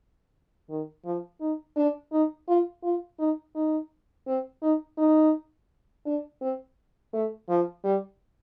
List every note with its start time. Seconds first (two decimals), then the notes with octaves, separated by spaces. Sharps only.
0.69 D#3
1.05 F3
1.41 D#4
1.76 D4
2.12 D#4
2.48 F4
2.83 F4
3.19 D#4
3.55 D#4
4.27 C4
4.62 D#4
4.98 D#4
6.06 D4
6.41 C4
7.13 A3
7.49 F3
7.84 G3